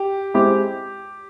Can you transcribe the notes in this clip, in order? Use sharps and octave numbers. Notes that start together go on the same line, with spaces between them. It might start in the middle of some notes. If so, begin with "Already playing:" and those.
Already playing: G4
G#3 C4 E4 G4